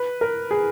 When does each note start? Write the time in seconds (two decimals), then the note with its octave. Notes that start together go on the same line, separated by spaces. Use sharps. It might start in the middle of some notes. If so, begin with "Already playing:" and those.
Already playing: B4
0.21 A#4
0.51 G#4